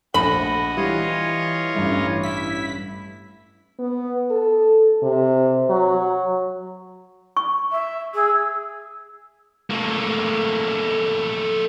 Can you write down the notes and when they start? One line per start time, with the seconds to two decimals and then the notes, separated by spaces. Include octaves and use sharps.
0.14 A#1 A3 F#4 D#5 B5
0.77 E3 G3 F4 C#5 D#5
1.74 A1 G2 A3
2.23 E4 B6
3.79 B3
4.31 A4
5.03 C3
5.70 F#3
7.37 C#6
7.72 E5
8.14 G#4 E6
9.70 A3 A#3